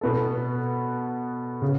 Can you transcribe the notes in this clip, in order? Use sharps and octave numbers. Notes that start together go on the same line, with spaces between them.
B2 B3 A4
C#3